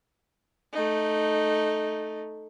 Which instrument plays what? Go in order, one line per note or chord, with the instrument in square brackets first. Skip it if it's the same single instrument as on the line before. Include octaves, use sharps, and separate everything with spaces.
[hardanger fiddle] A3 D#4